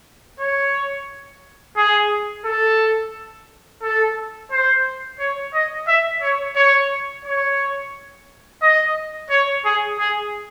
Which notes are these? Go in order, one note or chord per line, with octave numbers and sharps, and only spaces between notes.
C#5
G#4
A4
A4
C5
C#5
D#5
E5
C#5
C#5
C#5
D#5
C#5
G#4
G#4